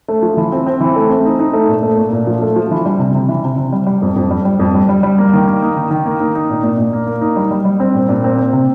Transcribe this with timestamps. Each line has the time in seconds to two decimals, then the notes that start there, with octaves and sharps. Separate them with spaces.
0.08 A3
0.22 F3
0.37 E3
0.52 C4
0.66 C4
0.80 E3
0.96 A3
1.10 C4
1.25 D#4
1.39 D#4
1.53 A3
1.68 A#2
1.83 A3
1.97 A#2
2.12 A#2
2.27 F3
2.41 A3
2.56 F3
2.71 E3
2.86 G3
2.99 C3
3.15 C3
3.29 E3
3.44 C3
3.58 C3
3.72 G3
3.86 G3
4.02 F2
4.16 F2
4.31 G3
4.45 G3
4.59 F2
4.75 G3
4.89 G3
5.03 G3
5.18 A#3
5.33 D#3
5.47 A#3
5.62 D#4
5.76 D#3
5.91 D#3
6.06 A#3
6.20 D#4
6.35 D#4
6.50 A#2
6.64 A#2
6.78 A#2
6.93 A#3
7.07 A#3
7.21 D#4
7.36 G3
7.51 G3
7.65 G3
7.80 C4
7.94 A#2
8.09 A#2
8.24 C4
8.38 C4
8.53 C3